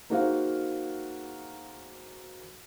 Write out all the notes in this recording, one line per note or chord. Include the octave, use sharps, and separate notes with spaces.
A#3 D#4 F#4 G#4 C5 F5